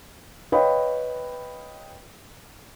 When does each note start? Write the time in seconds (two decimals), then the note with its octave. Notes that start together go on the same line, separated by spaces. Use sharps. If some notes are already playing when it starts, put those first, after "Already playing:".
0.52 B4 C#5 D#5 F5 G5 B5